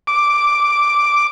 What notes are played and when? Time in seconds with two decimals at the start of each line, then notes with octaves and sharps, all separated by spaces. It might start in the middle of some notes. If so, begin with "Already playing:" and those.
0.07 D6